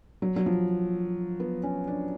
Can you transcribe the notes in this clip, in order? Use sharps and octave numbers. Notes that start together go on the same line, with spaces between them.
F#3
F#3
F3
B3
C#4
D4